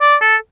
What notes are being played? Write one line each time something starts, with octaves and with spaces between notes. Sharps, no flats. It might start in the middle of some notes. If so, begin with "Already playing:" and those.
D5
A4